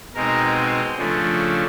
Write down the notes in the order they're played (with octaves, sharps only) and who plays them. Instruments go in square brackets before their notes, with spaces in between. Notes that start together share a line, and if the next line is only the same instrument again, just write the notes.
[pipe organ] B2 G#3 C4 D#4 A#4
C#3 F3 A3 D4